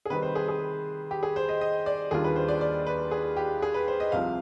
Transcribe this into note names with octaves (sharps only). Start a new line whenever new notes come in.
G#4
C3 D#3 G3 C4 B4
C5
G#4
G#4
G4
G#4
C5
D#5
D#5
D5
D#2 D#3 G3 D4 F4 G#4
B4
C5
D5
D5
B4
G#4
G4
G#4
B4
C5
D#5
C2 C3 F3 F5